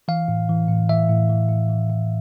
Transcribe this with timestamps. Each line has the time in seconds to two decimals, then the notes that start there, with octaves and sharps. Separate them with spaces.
0.08 E3 F5
0.28 A2
0.49 E3
0.68 A2
0.89 E3 E5
1.09 A2
1.29 E3
1.50 A2
1.69 E3
1.90 A2